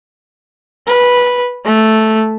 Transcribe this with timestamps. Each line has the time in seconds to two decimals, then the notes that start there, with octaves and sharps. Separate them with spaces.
0.87 B4
1.65 A3